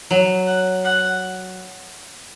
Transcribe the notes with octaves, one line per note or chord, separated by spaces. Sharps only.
F#3
F#5
F#5